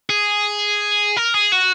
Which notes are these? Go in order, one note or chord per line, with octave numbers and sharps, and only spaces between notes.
G#4
A#4
G#4
F#4